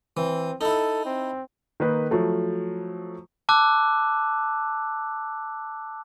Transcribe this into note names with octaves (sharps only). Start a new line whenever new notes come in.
E3 C4
D#4 E4 A4
C4
D#3 A#3 D#4 B4
F3 F#3 A3
A5 D6 E6 F#6